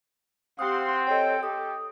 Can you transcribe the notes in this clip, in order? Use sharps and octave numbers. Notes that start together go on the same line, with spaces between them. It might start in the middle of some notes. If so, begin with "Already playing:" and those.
C4 G4 F5 F#5 C6 D#6
A4 C#5 D#5 G5
G4 D#6